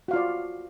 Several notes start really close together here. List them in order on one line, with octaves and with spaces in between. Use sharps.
F#4 F5 F4 D5